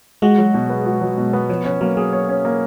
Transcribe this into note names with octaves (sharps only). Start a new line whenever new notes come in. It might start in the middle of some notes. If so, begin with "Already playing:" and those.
G#3 F#4
F#3
B2
B3
F#4
F#3
B2
B3
F3 C#5
F3 C#4
F#3 A#3
F#3 G#4
C#5
C#4
A#3